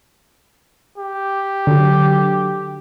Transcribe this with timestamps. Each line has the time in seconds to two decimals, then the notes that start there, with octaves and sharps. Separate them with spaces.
0.98 G4
1.67 D3 F#3